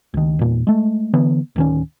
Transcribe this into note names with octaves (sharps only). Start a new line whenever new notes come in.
C#2 D#3
E2 A#2
G#3 A3
D3 E3 B3
D1 D#3 C#4